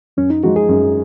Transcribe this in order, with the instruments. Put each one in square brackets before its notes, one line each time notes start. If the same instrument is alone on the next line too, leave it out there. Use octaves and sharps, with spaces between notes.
[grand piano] F#2 [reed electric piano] C#4
[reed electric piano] D#4
[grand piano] F3 G#3 D#4 [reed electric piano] F#4
[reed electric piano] G#4
[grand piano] F#2